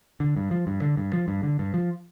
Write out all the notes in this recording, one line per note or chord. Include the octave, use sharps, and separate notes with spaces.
D3
G2
F3
G2
D3
G2
F3
G2
D3
G2
F3